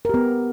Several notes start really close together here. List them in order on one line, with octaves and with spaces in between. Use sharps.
A#4 G4 B3